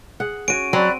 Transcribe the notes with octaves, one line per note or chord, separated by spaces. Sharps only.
G#4 F#5
C#4 F#4 C#5 D7 D#7
F#3 C4 D5 B5 F#6